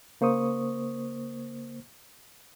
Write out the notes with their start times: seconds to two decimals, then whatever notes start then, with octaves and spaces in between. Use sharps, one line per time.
0.21 C#3 A#3 C5 C#6 D#6